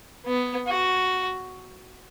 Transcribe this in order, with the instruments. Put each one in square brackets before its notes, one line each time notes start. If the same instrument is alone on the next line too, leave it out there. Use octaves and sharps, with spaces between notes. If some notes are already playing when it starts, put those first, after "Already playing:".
[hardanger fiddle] B3
F#4